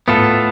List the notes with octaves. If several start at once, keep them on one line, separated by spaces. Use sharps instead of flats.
A2 B3 F4 A4